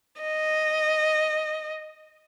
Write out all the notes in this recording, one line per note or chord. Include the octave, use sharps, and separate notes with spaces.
D#5